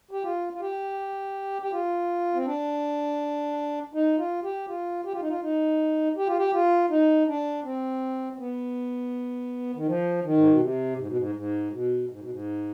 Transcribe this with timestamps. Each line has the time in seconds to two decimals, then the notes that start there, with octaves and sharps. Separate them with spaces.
0.11 G4
0.23 F4
0.53 F4
0.60 G4
1.62 G4
1.72 F4
2.34 C4
2.46 D4
3.94 D#4
4.18 F4
4.43 G4
4.68 F4
5.05 G4
5.13 F4
5.21 D#4
5.28 F4
5.42 D#4
6.17 G4
6.26 F4
6.38 G4
6.53 F4
6.90 D#4
7.27 D4
7.64 C4
8.33 C4
8.38 B3
9.75 D#3
9.87 F3
10.24 D#3
10.37 G#2
10.49 B2
10.60 C3
10.98 G#2
11.08 B2
11.17 G#2
11.35 G#2
11.72 B2
12.09 G#2
12.20 B2
12.30 G#2